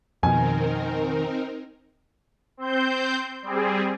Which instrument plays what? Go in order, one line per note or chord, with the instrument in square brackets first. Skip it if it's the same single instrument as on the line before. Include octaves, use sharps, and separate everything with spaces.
[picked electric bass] F2 B2 [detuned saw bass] D#3 [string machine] C4 D#4 A#4 [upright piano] G#5
[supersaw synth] C4 C5 G6
G3 C4 G#4